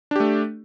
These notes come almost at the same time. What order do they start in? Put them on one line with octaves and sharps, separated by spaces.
D4 G4 A3